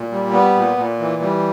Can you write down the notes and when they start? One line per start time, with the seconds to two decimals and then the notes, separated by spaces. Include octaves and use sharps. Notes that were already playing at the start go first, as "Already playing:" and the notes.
Already playing: A#2
0.12 G3
0.32 B3
0.55 A#2
0.77 A#2
0.99 E3
1.22 G3